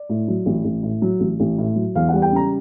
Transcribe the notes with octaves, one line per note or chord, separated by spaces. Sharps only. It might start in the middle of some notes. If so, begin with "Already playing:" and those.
Already playing: D5
A2
F#3
A1
A1
A2
F#3
A1
A1
A2
F#3
E2 F5
G3 F#5
G5
C#3 A#5